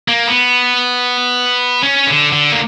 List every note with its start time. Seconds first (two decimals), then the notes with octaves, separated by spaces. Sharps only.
0.08 A#3
0.28 B3
1.82 C#4
2.07 D3
2.33 D3
2.52 A#3